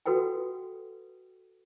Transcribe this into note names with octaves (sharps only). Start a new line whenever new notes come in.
F#4 A4 B4 F#5 G5